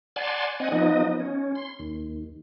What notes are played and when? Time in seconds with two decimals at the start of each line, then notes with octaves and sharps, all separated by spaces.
0.16 D5 F#5 G#5 A5 C6
0.60 C4 D#5 F#5 G#5
0.72 F3 B3 D#4 D#5
1.19 C#4
1.55 C6
1.79 D#2